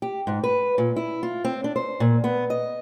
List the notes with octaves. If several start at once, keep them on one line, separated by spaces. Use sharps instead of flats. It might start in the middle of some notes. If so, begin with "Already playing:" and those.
G4
G#2
B4
A#2
E4
F4
C4
D4
C5
A#2
B3
D#5